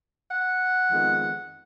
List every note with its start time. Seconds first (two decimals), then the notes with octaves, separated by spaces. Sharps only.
0.31 F#5
0.90 F2 D#3 G#3 B3